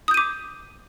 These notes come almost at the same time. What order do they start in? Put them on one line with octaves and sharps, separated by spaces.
D#6 G6 D#7 D6